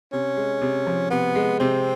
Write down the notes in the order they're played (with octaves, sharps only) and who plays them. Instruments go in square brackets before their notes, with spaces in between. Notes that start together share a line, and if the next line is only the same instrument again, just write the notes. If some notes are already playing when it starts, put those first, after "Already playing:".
[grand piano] C3 [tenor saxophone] C#4
[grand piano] G#3
C3
F3
[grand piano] C3 [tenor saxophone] B3
[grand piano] G#3
[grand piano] C3 [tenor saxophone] C4